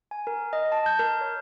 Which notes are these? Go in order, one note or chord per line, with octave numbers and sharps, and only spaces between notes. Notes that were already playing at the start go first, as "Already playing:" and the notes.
G#5
A#4
D#5
A5
G6
A#4
C#5